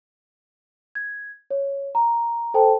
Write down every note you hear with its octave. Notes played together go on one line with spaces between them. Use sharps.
G#6
C#5
A#5
A4 C5 G5 A5